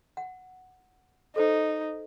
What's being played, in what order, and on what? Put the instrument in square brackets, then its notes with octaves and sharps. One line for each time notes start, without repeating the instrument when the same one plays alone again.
[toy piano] F#5
[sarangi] D#4 [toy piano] A4 C5